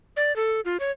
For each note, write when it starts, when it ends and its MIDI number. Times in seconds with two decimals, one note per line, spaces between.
0.17 0.35 74
0.36 0.61 69
0.65 0.77 65
0.80 0.91 73